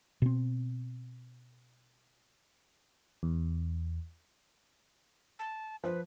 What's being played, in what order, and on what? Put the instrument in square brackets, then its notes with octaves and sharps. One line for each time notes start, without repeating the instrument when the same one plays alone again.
[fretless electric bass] B2 C4
[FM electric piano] E2
[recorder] A5
[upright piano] F3 [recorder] B4